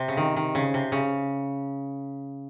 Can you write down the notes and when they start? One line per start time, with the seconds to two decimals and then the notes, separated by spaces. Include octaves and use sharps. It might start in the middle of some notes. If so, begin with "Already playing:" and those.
Already playing: C3
0.08 C#3
0.17 D#3
0.36 D#3
0.55 C#3
0.74 C3
0.92 C#3